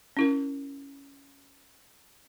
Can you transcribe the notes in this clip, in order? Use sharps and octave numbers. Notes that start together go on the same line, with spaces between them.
C#4 E4 A#4